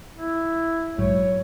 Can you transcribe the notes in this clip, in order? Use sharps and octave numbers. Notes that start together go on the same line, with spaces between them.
E4
A#1 G#2 F#3 C#5